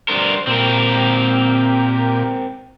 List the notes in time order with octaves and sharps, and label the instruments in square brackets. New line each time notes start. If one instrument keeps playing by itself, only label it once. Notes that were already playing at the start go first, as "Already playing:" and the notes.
[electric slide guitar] G3 D4 A#4 [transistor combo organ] C5
[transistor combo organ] A#2 G4 [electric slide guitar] C4 A#4